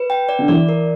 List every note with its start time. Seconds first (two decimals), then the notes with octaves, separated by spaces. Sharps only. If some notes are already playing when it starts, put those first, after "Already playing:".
Already playing: B4
0.10 G5
0.29 D5
0.39 D3
0.48 E3 D5
0.69 A#4